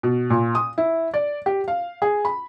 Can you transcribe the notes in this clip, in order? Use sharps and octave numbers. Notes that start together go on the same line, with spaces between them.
B2
A#2
D#6
E4
D5
G4
F5
G#4
B5